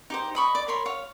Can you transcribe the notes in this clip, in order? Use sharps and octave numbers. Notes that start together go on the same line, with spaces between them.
D#4 G4 C5
D#5 B5 C#6
D5
A#4 C#5 B5 C6
C#5 F5